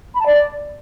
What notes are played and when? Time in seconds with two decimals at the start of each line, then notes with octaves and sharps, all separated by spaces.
0.15 B5
0.20 A5
0.26 D5